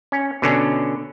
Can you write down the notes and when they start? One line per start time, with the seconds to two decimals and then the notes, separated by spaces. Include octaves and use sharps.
0.12 C#4
0.42 B2 D3 C#4